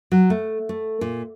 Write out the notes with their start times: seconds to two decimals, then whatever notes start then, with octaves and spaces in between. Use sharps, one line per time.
0.12 F#3
0.30 A3
0.69 A3
1.01 A#2